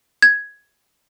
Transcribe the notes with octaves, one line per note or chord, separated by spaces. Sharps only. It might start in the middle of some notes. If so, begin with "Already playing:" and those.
G#6